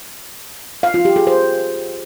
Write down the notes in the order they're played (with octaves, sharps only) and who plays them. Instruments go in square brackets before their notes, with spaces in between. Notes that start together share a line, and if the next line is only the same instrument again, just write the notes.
[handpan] F5
F4
G4
G#4
C5